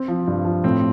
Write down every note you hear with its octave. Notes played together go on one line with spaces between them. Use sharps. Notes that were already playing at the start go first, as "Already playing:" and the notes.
Already playing: C4
F3
G2
F3
A2 C4